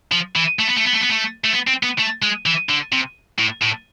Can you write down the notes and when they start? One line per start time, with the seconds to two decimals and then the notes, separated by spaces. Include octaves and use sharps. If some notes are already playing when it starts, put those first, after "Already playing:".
0.12 F3
0.36 E3
0.59 A3
0.68 B3
0.76 A3
0.85 B3
0.93 A3
1.01 B3
1.09 A3
1.44 A3
1.53 B3
1.67 C4
1.83 B3
1.99 A3
2.22 G#3
2.46 E3
2.69 D3
2.92 C3
3.39 A2
3.62 A2